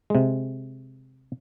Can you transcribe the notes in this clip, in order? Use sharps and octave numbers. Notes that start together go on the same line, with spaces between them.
C3 G#3